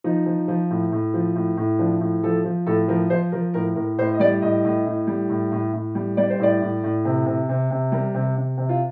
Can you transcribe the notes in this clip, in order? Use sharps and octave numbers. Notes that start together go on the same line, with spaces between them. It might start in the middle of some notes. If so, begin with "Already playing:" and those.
F3 D#4
F3
F3
A2
A2
F3
A2
A2
F3 D4
A2
F3 A4
F3
A2 A4
F3 A#4
F3 C5
F3 A#4
A2 A#4
A2 A#4
A2 C5
D#5
G3 D5
A2 D#5
A2
A2
G3
A2
A2
A2
G3
G3 D5
C5
A2 D5
A2
A2
C3
C3
C3
C3
G3 A#4
C3
C3
C3
F4